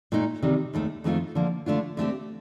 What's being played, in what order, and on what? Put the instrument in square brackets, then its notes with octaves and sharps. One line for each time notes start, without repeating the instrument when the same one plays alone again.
[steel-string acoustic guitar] A#2 A3 D#4
C3 D#3 G3
D#2 D#3 A3
F2 D#3 A3 C4 F4
D3 F3 A#3
D3 A3 D4 F4
D3 A3 C4 G4